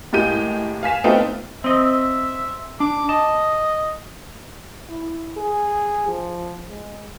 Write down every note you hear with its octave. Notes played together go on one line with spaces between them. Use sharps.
A2 G#3 A#3 G4 G6 D#7
F5 G#5 B6 E7
A3 B3 C4 D#4 F4 G5
C4 D#5 E5
D4 D6
D#5 A5
E4
G#4
F3
G#3